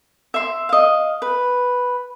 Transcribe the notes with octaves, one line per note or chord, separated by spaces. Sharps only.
E5 C6
D#5 F5
B4